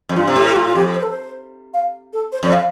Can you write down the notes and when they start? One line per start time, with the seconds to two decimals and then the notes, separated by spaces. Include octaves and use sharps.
0.09 F2
0.16 G2 F4
0.27 C3
0.35 A2 G4
0.51 G4
0.56 A2 F4
0.66 F4
0.75 F2 G4
0.94 C5
1.03 A4
1.10 C5
1.74 F5
2.13 A4
2.32 C5
2.43 F2 D5
2.53 F5